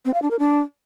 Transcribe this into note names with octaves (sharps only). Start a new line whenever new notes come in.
C4
F5
D4
A#4
D4